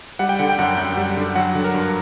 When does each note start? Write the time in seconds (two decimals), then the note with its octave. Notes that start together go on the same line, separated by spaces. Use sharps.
0.19 G3 F#5
0.29 G5
0.39 D3 F#5
0.49 G5
0.58 F#2 F#5
0.77 F#2 G5
0.97 G3
1.17 D3
1.35 F#3 F#5
1.55 D3
1.64 A#4
1.74 G2